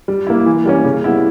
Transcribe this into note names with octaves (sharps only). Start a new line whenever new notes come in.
G3
A#3 E4
E3
G3 A#3 C#4
C#3
G3 B3 E4